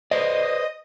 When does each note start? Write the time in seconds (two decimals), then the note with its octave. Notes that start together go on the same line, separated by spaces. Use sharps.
0.11 B4 C5 D5 D#5